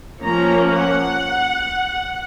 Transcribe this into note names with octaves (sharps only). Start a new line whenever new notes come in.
F3 A#3 C#4 A#5
F#5